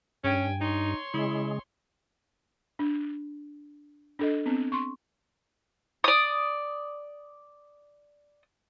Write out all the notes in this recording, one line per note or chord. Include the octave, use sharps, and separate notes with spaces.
G2 C#4 G5 G#5
D#4 C#5 C6
C#3 G#3 E4
D4
D4 A4 D#5
B3 C4
C6 C#6
D5 D#6